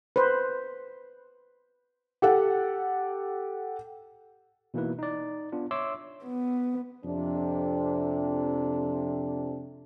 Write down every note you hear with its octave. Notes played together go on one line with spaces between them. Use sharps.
B4 C5
G4 A4 F#5
B2 E3 A#3 D#4 E4 B4
D#4 D5
B3 D4 F4
C#5 E5 C6 D6 E6
B3
F2 C3 D4